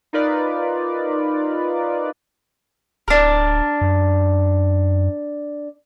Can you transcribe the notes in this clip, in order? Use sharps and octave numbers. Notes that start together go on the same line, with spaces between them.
D#4 F4 A#4 B4 D5
D1 D4 A#4
F#2